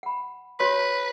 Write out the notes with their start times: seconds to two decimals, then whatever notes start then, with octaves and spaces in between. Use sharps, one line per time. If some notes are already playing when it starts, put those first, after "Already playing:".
0.03 F#5 B5
0.60 F#4 B4 C#5 C6